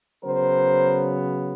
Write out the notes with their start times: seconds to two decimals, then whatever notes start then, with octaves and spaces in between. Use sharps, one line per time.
0.24 C#3 F#3 B3 A#4 C5